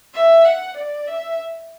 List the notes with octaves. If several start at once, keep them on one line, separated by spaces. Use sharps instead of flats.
E5
F#5
D5
E5